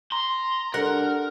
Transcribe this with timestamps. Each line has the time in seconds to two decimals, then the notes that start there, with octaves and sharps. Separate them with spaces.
0.12 A#5 C6
0.74 G3 D4 A4 A#4 F#5